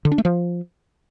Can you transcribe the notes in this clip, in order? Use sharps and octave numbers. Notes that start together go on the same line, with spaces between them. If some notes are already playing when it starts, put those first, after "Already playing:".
D3
D4
A3
F3